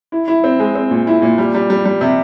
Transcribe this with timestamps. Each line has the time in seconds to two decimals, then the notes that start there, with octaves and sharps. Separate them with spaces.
0.12 E4
0.28 E4
0.44 C4
0.60 G#3
0.75 C4
0.91 A#2
1.07 E4
1.22 A#2
1.38 G3
1.54 G3
1.70 G3
1.85 G3
2.01 C3